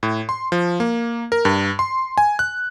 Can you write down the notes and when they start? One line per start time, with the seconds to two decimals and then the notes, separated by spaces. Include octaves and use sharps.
0.03 A2
0.29 C6
0.52 F3
0.80 A#3
1.32 A#4
1.45 G2
1.79 C6
2.18 G#5
2.39 F#6